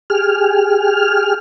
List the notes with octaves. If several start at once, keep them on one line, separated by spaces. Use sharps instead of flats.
G4 G#4 F6